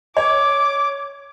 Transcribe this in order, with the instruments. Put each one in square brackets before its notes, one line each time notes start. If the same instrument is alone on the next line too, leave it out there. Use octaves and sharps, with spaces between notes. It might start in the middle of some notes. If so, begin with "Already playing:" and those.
[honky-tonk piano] C#5 [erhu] D6